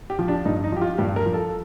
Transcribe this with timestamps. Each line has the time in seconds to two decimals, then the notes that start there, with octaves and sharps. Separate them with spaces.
0.10 G4
0.19 F3
0.28 D4
0.45 G2 D#4
0.64 D#4
0.72 F3 G4
0.82 F4
0.98 G2 G4
1.16 A#4
1.26 F3
1.34 A4